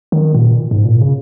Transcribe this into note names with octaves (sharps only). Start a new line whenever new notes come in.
D#3
A#2
G#2
A#2
C#3